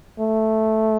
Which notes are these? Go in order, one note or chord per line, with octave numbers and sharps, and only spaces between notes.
A3